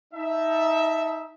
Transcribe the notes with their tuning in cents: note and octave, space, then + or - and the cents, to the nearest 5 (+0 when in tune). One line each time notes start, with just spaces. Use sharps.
D#4 +25 E5 +0 A5 +0